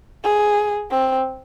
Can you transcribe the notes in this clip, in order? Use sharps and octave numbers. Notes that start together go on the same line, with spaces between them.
G#4
C4